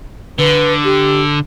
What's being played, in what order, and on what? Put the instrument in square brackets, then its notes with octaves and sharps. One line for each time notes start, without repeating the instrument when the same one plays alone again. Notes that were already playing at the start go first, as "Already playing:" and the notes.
[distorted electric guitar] D3 [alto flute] B4
[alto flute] G4